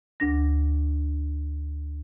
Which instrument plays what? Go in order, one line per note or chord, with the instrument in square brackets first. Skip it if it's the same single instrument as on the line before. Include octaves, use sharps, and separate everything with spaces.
[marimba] D2 D4 A#6